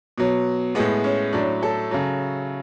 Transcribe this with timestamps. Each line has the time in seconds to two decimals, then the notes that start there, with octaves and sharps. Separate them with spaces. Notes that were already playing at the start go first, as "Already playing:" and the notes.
0.18 B2 F#3
0.75 A2 G#3 B3
1.04 C#4
1.33 A2 F#3 D4
1.63 A4
1.91 C#3 F#3